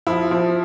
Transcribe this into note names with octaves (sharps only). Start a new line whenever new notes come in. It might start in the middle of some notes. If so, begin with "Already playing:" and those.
F3 E4
F3